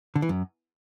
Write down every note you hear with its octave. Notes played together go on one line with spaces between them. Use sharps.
D3
E3
F#2